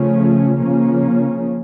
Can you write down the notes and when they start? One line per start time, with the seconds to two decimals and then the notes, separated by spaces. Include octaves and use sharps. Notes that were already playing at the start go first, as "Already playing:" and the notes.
Already playing: C#3 F3 A3 C#4
0.58 C#3 F3 A#3 C#4